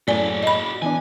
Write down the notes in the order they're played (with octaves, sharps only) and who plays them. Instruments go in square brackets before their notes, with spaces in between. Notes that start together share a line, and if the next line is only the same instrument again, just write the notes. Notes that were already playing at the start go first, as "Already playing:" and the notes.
[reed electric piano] F#2 A2 A#3 [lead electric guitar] F#4 G#4 [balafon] D5 G#5
[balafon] D#5 B5
[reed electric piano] E3 B3 D4 [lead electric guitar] G#5